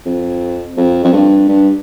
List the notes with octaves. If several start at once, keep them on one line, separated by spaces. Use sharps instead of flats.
F2
F2
F2
G2
G2